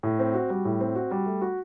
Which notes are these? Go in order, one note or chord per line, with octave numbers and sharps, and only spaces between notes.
A2
C4
F#4
G3
A2
C4
F#4
G3
A3
F#4